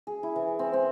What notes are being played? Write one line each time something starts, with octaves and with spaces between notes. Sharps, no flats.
G#4
E4
E3
C4
C4